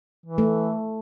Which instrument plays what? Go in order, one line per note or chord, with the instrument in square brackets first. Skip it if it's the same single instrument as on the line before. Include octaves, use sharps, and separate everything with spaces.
[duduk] E3
[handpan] A3